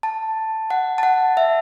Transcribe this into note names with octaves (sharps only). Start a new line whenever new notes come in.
A5
F#5
A5
F#5
E5